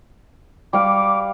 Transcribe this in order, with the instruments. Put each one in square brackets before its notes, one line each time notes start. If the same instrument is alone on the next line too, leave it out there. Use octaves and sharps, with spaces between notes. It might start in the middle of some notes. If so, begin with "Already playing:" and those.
[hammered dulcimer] G3 F5 [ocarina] D6